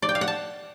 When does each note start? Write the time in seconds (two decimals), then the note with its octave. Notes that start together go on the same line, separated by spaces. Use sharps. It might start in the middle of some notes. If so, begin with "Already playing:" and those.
0.02 D5
0.09 G5
0.15 F5
0.21 F#5
0.28 A5